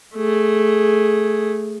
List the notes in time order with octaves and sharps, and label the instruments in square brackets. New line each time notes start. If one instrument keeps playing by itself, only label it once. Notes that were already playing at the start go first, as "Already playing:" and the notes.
[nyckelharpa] A3 G#4